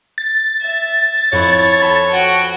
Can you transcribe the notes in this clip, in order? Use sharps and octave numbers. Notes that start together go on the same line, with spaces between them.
A6
E5 A6
F2 E4 C#5
A4 A5 B5
F#4 G5